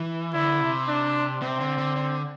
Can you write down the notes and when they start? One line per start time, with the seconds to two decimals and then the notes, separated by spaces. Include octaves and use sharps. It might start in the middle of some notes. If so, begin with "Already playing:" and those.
Already playing: E3
0.34 D3 E4
0.60 C3
0.88 D4
1.42 C3 C4
1.60 D3
1.78 D3
1.96 D3